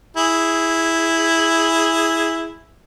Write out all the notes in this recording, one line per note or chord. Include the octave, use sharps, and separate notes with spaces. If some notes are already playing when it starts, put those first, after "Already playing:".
E4 G#4